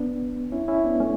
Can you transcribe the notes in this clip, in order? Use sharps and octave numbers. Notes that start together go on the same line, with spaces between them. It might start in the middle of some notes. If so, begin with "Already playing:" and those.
Already playing: B3 D4
C#4 E4
C#4 E4
B3 D4
A3 C#4